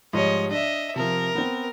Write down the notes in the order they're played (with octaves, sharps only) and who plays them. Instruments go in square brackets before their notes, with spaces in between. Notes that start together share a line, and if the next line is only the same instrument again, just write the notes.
[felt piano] G#2 F3 G3 [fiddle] C#5 D#5
[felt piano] D4 [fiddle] D#5 E5
[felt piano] C3 F3 [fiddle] A#4
[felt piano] B3 C4